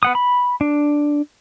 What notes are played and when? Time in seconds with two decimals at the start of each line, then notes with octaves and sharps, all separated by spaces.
0.03 B3 F#5 D#6
0.15 B5
0.61 D4